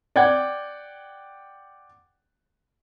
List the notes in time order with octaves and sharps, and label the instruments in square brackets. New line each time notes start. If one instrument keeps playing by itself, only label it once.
[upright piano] D5 F#5 G5 G#6